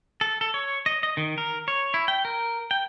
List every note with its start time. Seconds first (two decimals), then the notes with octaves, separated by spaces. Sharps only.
0.21 A4
0.41 A4
0.54 C#5
0.86 D#5
1.03 D#5
1.17 D#3
1.38 A#4
1.68 C#5
1.94 E4
2.08 G5
2.25 A#4
2.71 G5